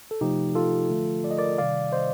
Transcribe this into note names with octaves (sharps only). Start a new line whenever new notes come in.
A4
C3 F3 A3 D#4 G4
F4 A4
D3 F3 A3
D5
D#5
A#4 D5
C3 D#3 G3 D5 F5
C5 D#5